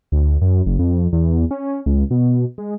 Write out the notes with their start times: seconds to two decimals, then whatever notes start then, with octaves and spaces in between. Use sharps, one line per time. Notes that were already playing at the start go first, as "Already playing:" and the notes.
0.12 D2
0.41 F#2
0.66 F#1
0.79 F2
1.13 E2
1.51 C#4
1.86 C#2
2.11 B2
2.58 G#3